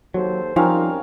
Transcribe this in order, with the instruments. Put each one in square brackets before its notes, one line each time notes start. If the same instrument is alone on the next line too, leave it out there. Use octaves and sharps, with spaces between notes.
[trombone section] D#2 A4 C5 [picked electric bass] F#3
[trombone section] F#2 G3 A#4 [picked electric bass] F3 [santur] C4 C#4 F5 [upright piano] D#4